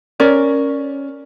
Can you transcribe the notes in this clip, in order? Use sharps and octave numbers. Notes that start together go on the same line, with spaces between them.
C#4 A#4 D5